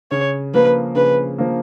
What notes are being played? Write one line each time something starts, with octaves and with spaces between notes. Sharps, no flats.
C#3 C#5
F3 A#3 B4
C#3 B4
F3 A#3